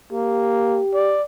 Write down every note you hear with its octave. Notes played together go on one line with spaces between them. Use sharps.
A#3 G4
D5